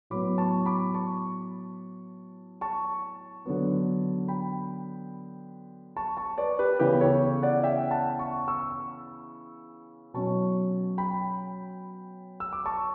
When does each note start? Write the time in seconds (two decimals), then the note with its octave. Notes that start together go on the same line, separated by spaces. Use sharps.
0.10 A2 F#3 B3 B5 D6
0.38 A5 C#6
0.66 B5 D6
0.94 A5 C#6
2.61 A5 C#6
3.45 D3 F#3 B3
4.28 G5 B5
5.97 A5 C#6
6.17 A5 C#6
6.38 B4 D5
6.59 G4 B4
6.79 C#3 E3 B3 G4 B4
7.00 A4 C#5
7.42 D5 F#5
7.63 E5 G5
7.91 F#5 A5
8.19 A5 C#6
8.48 C#6 E6
10.14 B2 F#3 C#4 A5 C#6
10.98 G5 B5
12.40 E6
12.53 D6
12.66 A5 C#6